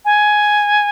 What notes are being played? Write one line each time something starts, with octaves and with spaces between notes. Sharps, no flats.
G#5